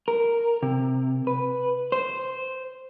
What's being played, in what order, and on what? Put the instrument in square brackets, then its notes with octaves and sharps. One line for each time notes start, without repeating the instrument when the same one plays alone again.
[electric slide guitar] A#4
C3
B4
C5